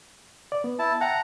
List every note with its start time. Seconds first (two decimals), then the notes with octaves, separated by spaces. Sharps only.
0.52 D5
0.64 B3
0.79 E4 A5
1.01 E5 F#5 G5 A5 A#5